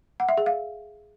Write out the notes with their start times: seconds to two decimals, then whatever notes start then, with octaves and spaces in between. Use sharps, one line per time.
0.20 F#5
0.29 E5
0.37 G#4
0.46 F5